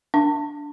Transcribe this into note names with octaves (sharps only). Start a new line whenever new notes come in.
D4